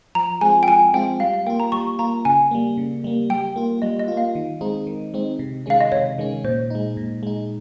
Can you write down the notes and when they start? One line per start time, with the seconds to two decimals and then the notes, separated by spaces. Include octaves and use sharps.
0.15 F3 A#5
0.41 G#3 C4 F4 G#5
0.63 G5
0.68 F3 G#5
0.94 G#3 C4 F4 G5
1.20 G3 F5
1.34 F5
1.46 A#3 F4 G5
1.60 A#5
1.72 G3 C#6
1.99 A#3 F4 A#5
2.25 C#3 G#5
2.51 G3 A#3
2.77 C#3
3.04 G3 A#3
3.30 G3 G5
3.56 A#3 F4
3.82 G3 D#5
3.99 D#5
4.08 A#3 F4
4.17 F5
4.35 D#3
4.61 G#3 C4 D#4
4.87 D#3
5.14 G#3 C4 D#4
5.39 C3
5.66 D#3 G#3 C#4 F5
5.80 D#5
5.92 C3 C#5
6.18 D#3 G#3 C#4
6.44 A#2 C5
6.70 G#3 D#4
6.97 A#2
7.23 G#3 D#4